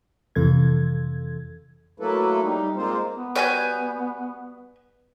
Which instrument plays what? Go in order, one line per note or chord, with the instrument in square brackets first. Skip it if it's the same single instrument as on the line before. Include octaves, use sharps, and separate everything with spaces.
[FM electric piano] F2 C3 E3 A4 G#6
[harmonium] F#3 A3 A#3 E4 A4 B4
G3 D#4
A#2 G#3 A#3 C4 F4 C5
[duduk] B3
[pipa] G3 F#4 C#5 [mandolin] B4 G#5 G6